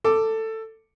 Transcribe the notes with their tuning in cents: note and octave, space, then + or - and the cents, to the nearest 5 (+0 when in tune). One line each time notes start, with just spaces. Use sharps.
A4 +15 D6 +0